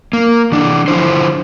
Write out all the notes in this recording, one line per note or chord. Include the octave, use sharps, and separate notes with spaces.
A#3
E3 D4
D3 F3 E4 C5